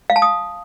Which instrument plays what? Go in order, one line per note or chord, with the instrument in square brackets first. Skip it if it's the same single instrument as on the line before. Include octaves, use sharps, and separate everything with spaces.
[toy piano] F5
A5
D#6